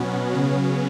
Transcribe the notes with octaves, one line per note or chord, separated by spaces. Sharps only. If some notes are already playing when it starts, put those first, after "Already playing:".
Already playing: B2 F#3 B3 C#4
C#3 F#3 B3